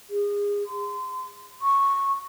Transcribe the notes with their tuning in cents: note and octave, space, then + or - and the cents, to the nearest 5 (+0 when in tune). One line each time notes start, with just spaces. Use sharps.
G#4 -30
C6 -30
C#6 -10